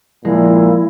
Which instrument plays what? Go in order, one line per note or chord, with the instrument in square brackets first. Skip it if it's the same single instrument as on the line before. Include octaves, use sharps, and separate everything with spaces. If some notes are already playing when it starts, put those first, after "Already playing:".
[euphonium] A#2 [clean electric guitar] F3 G#3 [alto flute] E4